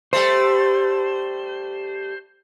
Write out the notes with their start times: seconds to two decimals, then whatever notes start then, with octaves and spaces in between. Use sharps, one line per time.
0.13 G3 A3 C5